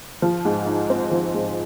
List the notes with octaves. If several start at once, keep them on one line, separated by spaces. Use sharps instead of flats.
F3
G#2
D#4
C4
F3
G#2